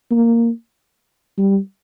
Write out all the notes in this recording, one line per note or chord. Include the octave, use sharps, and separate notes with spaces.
A#3
G3